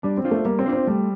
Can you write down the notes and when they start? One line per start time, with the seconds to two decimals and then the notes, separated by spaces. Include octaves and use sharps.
0.03 G3 D4
0.17 C4
0.24 D4 F4 C5
0.31 A3
0.45 G3 A#3
0.59 C4
0.66 D4 F4 C5
0.73 C4
0.87 G3 A3